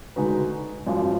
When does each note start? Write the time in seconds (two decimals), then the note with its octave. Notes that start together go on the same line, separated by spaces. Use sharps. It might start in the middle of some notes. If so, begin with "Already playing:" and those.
0.16 D3 G#3 D#4 F#4 B4
0.86 G#1 F#2 F3